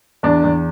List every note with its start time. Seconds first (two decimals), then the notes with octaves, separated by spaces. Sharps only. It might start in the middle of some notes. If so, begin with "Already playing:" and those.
0.23 E2 D4
0.44 E2